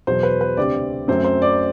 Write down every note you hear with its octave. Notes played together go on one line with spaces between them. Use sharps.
E2 B2 F#3 C5
B4
B4
D2 C3 G3 C4 D5
F#2 F#3 A3 C4 C5
C5
D5